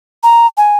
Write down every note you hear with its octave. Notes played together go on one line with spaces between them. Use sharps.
A#5
G#5